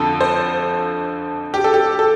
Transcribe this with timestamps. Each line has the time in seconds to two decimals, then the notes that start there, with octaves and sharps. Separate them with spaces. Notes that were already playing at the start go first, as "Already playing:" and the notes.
Already playing: F2 D3 F3 A4
0.21 C5
1.54 G4
1.64 A4
1.74 G4
1.99 A4